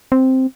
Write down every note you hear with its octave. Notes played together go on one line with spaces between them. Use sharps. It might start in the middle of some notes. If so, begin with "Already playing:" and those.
C4